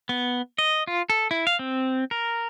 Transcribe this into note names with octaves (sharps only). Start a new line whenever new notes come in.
B3
D#5
F4
A4
E4
F5
C4
A#4